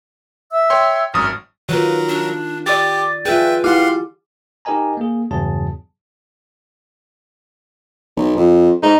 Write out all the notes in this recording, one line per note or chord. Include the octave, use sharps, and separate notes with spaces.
E5 E6
C#5 G5 C6
G#1 F#2 C#6 D#6 F6
D#3 F#3 F4 A#4 B4
D4
G4 D5 D6 A6
F4 G#4 B4 E5 G5
E4 G4 F5 F#5 C6 D6
D#4 G4 A#4 D#5 G#5 A#5
A#3 G#4
E2 G2 C#3 F#3 G#4 A5
B1
F2
G#2 D#4